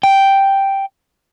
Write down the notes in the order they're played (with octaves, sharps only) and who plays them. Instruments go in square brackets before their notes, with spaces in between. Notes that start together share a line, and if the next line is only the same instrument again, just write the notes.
[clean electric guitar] G5